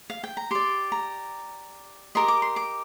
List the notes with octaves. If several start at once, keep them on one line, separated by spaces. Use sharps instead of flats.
F5
G5
A#5
G4 D5 C6
A#5
G4 A#4 D#5 C6
D6
C6
D6